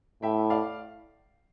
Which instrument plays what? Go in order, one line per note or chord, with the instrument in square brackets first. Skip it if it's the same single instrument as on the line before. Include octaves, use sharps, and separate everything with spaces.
[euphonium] A2 [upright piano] E5 G5
[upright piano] D5 F5